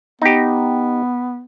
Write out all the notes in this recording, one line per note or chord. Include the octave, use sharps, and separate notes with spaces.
B3 D#4 G4